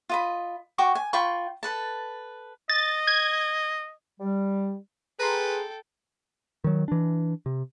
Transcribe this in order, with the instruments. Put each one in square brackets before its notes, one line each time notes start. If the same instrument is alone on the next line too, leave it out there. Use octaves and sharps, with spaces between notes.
[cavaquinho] F4 D#5 B5
F#4 G5 C#6 D6
G#5
F4 G5 B5 C#6
A4 B4 A5
[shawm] D#5 [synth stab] A6
[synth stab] G#6
[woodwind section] G3
[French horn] G#4 [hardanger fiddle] A4 G5 [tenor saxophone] B4 [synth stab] A#5 C6
[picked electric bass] D#3 F#3
E3 D4
C3